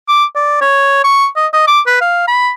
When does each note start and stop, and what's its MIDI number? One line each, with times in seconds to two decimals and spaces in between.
0.08 0.25 86
0.35 0.57 74
0.61 0.99 73
1.04 1.27 85
1.36 1.47 75
1.53 1.66 75
1.67 1.80 86
1.86 1.98 71
2.01 2.26 77
2.28 2.51 83